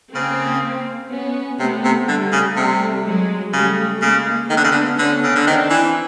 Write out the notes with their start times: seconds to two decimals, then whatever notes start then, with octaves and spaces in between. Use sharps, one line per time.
0.14 C#3 A#3 C4
1.10 B3 C#4
1.59 C3 A3 B3
1.84 C3
2.08 D3 G3 A3
2.32 C#3
2.56 C3 G3 A3
3.04 F#3 G#3
3.53 C#3 G3 A3
4.01 C#3 G#3 A#3
4.49 D#3 A3 B3
4.57 D3
4.64 C#3
4.71 D3
4.98 D3 B3 C#4
5.24 C#3
5.35 D3
5.46 D#3 C4 D4
5.70 E3